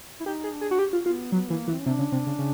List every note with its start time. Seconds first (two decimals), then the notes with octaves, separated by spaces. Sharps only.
0.20 E4
0.26 D#4 G4
0.44 G#4
0.52 D4
0.61 G#4
0.71 F#4
0.79 G4
0.93 F4
1.05 B3 F4
1.32 F#3 B3
1.50 E3 A#3
1.67 E3
1.72 C4
1.79 C#4
1.86 C3 D4
1.99 C#3
2.12 C3
2.27 C#3
2.39 C#3